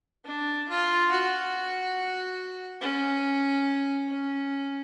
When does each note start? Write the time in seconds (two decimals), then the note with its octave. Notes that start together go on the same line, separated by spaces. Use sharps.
0.25 D4
0.68 F4
1.11 F#4
2.81 C#4
4.08 C#4